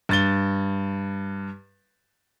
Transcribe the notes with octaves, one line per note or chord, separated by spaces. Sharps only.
G2 A6 G7